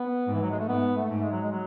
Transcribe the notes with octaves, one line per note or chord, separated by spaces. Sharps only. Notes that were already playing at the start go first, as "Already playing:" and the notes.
Already playing: B3
G#2
E3
F#3
G#3
A3
G#2 B3
A3
G#2
G#3
F#3
G#3
F#3